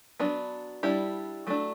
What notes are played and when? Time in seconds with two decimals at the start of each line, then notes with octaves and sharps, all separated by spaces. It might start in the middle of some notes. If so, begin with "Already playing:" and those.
0.20 F#3 B3 D4
0.83 G3 D4 E4 G4
1.47 F#3 A3 D4